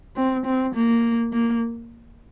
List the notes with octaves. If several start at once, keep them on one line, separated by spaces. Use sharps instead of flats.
C4
C4
A#3
A#3